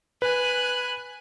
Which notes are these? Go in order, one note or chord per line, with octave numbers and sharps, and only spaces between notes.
B4 G#5 F#6